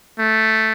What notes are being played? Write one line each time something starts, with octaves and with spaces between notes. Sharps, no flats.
A3